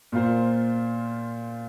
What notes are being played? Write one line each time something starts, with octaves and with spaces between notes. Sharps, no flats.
A#2 A#3 F4 C5